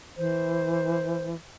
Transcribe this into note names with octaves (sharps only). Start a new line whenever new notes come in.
E3 C5